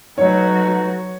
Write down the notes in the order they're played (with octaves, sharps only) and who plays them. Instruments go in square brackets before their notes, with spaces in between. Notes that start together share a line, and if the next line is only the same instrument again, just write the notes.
[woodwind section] B2 D#4 [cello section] F#3 A3 F#4 [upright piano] C#5